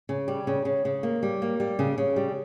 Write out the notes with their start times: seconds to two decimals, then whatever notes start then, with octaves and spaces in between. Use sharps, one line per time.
0.09 C#3
0.28 G3
0.47 C#3
0.65 C#3
0.85 C#3
1.03 A#3
1.23 G3
1.42 A#3
1.60 G3
1.79 C#3
1.98 C#3
2.16 G3